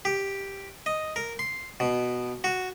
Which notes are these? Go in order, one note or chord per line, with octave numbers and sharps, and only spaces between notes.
G4
D#5
A#4
C6
B2
F#4